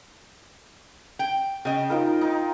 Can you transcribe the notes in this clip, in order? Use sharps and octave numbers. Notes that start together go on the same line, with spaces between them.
G5
C#3 D#5 G5
D#4 F4 A#4
D#4